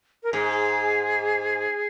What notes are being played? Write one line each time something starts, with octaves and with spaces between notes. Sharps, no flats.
A#4
G#2 G#4